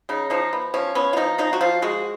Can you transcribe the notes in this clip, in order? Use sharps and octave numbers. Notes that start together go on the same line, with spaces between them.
C#3 D#4
F3 D#4
B3
F3 C#4
B3 C#4
F4
F3 D#4
F3 D#4
F#4
F3 F4
G#3 F#4